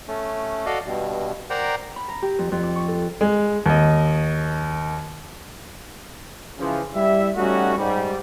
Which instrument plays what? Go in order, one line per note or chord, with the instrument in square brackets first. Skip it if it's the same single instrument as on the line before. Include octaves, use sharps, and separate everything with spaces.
[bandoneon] A3 C#4
F#4 A4 D5 D#5 F5
G2 B2
A#4 C5 D5 F#5 G5 A#5
[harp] B5
A#5
G4
F2
F2
D6
C#6
A4
[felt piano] G#3
D#2 D#5
[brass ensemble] C#3 E3 F3
G3 E4 E5
G3 A3 C#4 D#4 F#4
G#2 G3